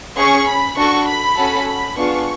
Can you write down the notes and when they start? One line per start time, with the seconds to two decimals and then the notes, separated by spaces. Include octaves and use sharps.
0.16 C#4 G#4 C#6
0.47 B5
0.76 D4 F#4 A4 C#6
1.06 B5
1.37 C#4 F#4 A4
1.67 B5
1.97 B3 D4 F4 G#4 C#6